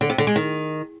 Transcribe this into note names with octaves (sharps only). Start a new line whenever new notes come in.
D3
C3
D3
G#3
D#3